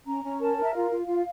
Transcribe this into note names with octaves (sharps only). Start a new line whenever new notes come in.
C#4 A#5
C#4
A#4 A5
A#4
E5
F4 F5
F4
F4